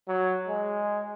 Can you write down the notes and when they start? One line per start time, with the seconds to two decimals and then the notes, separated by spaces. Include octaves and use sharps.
0.08 F#3
0.48 G#3